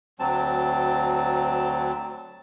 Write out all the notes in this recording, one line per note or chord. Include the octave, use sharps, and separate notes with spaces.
D2 F#3 C4 A5